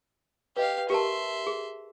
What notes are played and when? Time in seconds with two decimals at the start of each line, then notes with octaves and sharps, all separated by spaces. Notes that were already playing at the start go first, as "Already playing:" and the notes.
0.57 G4 B4 D#5 F5
0.90 G4 A#4 E5 A5 C6
1.47 G#4